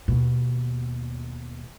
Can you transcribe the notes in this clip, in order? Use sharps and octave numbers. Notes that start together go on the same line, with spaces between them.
D#2 B2